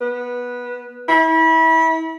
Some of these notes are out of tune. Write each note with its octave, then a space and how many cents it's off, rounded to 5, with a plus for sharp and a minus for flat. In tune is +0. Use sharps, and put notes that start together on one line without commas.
B3 -15
E4 -30